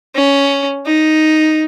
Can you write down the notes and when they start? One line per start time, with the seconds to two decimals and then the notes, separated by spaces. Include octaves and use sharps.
0.15 C#4
0.86 D#4